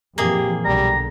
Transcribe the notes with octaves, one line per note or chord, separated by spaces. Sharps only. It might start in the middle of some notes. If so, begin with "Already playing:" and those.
F2 A#2 E3 A#3 G4 G#4
B1 D3 G3 A#5